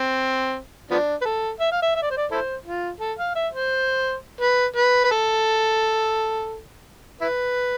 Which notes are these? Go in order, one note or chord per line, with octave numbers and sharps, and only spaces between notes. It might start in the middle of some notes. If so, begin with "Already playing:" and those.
Already playing: C4
F3 B3 D4
B4
A4
E5
F5
E5
E5
D5
C5
D5
E4 A4 C5
F4
A4
F5
E5
C5
B4
B4
B4
A4
E4 B4